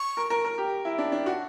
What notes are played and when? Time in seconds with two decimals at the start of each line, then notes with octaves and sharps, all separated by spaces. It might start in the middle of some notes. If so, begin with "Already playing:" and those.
Already playing: C#6
0.17 A#4
0.30 A#4
0.45 A#4
0.58 G4
0.85 E4
0.98 D4
1.12 D4
1.26 F#4